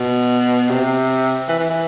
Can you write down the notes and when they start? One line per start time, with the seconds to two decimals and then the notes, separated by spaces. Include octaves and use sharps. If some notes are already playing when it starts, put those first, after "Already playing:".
Already playing: B2
0.70 C3
1.48 E3
1.59 E3
1.70 E3